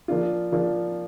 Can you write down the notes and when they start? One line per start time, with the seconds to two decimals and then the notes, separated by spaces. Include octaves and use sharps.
0.08 F3 A#3 D4 F4
0.52 F3 A#3 D4 F4